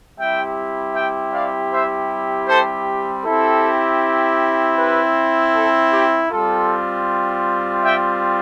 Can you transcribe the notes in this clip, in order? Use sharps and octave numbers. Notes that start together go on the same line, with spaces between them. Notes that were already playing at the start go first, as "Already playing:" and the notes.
G3 C4 E4 G4 E5 G5
E5 G5
D5 F5
C5 E5
A4 C5
C4 E4 G4 A4
G4 B4
A4
G4
G3 C4 F4 A4
E5 G5